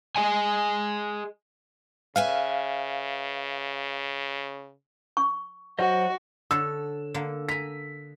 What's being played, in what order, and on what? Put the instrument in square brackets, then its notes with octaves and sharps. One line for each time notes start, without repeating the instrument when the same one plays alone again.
[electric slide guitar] G#4 D#5 G#5
[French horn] C#3 [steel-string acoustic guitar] B4 E5 G#5 [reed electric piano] F5
[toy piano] C#6
[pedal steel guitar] F#3 C5 D#5 [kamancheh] F#4 [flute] F#5
[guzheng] D3 A4 C#5 [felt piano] E6
[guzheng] D3 A#3
[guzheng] G#5 A#5 [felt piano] B6